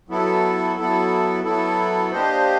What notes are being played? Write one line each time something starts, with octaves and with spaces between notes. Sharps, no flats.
F#3 B3 E4 A4
F#3 B3 E4 A4
F#3 B3 E4 A4
A#3 D4 G4 C5 D#5